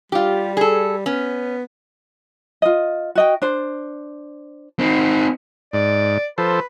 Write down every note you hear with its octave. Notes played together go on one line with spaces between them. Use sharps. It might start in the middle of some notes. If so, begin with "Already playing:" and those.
G3 F4 G4
G#4 A4
B3 C#4
F4 D#5
F#4 D#5 G5
D4 C5
C4 D#4
G#2 D5
F3 A4 B4 C5